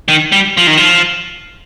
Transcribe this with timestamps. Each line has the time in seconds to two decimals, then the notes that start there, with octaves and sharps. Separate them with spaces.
0.08 D#3
0.32 G3
0.57 F3
0.67 D#3
0.77 F3